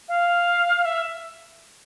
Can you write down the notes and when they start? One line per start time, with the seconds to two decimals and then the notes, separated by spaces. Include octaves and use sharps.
0.09 F5
0.85 E5